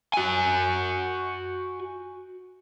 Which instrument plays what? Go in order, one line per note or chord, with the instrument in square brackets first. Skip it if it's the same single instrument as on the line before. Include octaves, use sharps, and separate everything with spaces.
[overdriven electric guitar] F#4 G#5